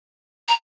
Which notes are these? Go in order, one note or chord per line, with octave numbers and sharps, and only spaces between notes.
A#5